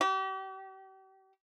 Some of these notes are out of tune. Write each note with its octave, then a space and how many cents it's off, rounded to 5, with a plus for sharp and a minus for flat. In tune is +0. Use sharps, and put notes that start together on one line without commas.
G4 -40